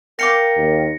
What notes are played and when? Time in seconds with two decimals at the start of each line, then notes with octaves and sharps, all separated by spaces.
0.19 A#4 F5 G5 D6 A#6 C#7
0.57 D#2